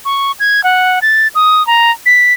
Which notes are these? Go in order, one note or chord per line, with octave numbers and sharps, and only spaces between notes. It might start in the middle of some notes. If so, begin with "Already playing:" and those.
C#6
G#6
F#5
A6
D#6
A#5
B6